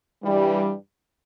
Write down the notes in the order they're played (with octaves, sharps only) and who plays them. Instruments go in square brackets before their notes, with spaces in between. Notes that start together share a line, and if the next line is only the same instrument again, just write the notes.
[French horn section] G2 E3 G3